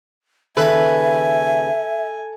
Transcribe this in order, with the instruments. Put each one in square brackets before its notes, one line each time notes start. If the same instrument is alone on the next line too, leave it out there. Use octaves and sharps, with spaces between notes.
[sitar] D#2 C#3 B4 [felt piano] A4 [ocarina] E5 [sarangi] G#5